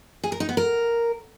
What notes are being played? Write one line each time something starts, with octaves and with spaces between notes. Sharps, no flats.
G#4
A#4
D#4
B3
A#4